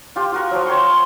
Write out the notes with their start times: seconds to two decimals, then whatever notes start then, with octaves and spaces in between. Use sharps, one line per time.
0.16 F4 G4 G5
0.32 F4 F#4 A#4
0.51 F3 F#3
0.66 C#5 G5 C6 C#6